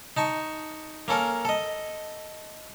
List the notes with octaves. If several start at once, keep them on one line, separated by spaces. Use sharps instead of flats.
D#4 A5 C#6
A#3 C#4 A4 A#4
A4 D#5